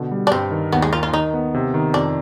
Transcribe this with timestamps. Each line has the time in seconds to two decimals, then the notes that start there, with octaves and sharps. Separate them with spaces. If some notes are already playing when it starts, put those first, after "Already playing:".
Already playing: B2 D3
0.11 G3
0.27 D4
0.31 G2 C4
0.51 D#3
0.72 D#2 B3
0.82 G#3
0.92 D#3 F4
1.03 F4
1.13 D#3 D#4
1.34 B3
1.54 C3
1.74 D#3
1.94 F2 D4